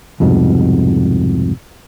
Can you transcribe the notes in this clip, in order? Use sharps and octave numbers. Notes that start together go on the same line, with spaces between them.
C2 F2 G#2 B2